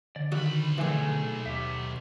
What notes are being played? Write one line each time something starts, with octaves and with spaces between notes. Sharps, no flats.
D3 D5
B1 D#3 F#4 B5
A#2 D#3 E3 A3 G#4
D#2 G4 E5